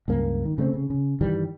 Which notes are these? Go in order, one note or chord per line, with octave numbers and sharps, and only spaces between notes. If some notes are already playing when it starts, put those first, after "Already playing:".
C#2 G2 A#3
D#3
C#3 A3 A#3 C4
C#3
C#3
G2 D#3 E3 G3